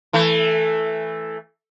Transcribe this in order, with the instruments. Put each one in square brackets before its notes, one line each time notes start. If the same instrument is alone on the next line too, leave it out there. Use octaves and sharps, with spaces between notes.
[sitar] E3 A3